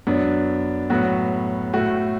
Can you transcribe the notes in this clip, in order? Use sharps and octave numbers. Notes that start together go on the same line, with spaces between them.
F#2 F#3 B3 D4
A2 F#3 B3 F#4
A2 A3 F#4